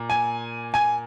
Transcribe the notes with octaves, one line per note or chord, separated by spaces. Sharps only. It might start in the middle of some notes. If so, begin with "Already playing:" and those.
Already playing: A#2
G#5
G#5